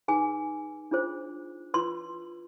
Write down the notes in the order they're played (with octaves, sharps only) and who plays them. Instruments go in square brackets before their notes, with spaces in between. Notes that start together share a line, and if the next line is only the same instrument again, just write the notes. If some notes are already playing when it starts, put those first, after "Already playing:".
[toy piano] D#4 G#4 B4 G#5
D4 F4 G#4 C5
F4 B4 C6